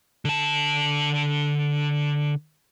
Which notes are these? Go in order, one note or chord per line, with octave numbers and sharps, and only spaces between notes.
D3 A5